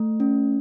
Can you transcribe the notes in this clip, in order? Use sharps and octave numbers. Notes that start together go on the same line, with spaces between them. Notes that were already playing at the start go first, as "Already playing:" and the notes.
Already playing: A3
C#4